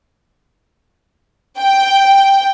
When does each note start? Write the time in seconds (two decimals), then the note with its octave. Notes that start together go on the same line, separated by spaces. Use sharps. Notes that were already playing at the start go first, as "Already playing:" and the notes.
1.59 G5